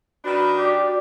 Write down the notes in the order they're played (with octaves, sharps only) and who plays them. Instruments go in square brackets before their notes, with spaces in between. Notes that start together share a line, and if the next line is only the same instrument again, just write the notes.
[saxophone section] D#3 D4 [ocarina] F#4 [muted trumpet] B4
[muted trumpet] G4 [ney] D5